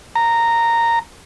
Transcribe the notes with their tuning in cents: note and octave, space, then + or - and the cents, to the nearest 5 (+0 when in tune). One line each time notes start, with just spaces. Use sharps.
A#5 -10